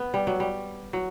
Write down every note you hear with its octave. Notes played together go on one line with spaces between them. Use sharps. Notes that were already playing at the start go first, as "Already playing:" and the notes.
Already playing: B3
G3
F#3
G3
F#3